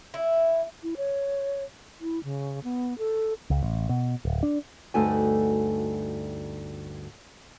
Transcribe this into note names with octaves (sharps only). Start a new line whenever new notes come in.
E4
E4
C#5
E4
C#3
B3
A4
C#2
A1
B2
D1
D4
D2 G2 A3 D#4 F#4 G#5